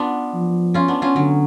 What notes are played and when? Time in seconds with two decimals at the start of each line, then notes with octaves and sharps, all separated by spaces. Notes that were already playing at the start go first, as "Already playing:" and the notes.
Already playing: B3 D4 F4
0.34 F3
0.74 C#4 F4
0.88 B3 D4
1.02 C#4 F4
1.16 D3 F#3